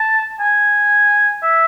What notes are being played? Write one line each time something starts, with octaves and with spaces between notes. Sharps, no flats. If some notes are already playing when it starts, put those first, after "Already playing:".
Already playing: A5
G#5
E5